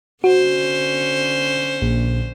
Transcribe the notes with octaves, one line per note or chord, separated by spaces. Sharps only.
D3 C#4 F#4 C5
A#1